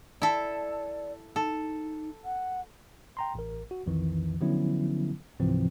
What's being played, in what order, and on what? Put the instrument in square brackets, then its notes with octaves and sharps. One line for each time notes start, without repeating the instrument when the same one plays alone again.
[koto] E4 A4 [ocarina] D5
[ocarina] D#4 [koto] A4
[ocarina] F#5
[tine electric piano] G5 A#5 C6
A1 A#4
F#4
B1 F2 D#3 E3
D3 F3 F#3 B3 C#4 E4
C#2 G#2 C3 E3 F3 C4